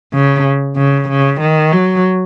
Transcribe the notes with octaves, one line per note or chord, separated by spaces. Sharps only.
C#3
C#3
C#3
D#3
F#3